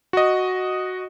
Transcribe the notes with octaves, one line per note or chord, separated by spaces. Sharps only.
F#4 D#5